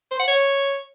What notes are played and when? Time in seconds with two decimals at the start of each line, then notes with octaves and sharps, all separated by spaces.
0.11 C5
0.19 F#5
0.28 C#5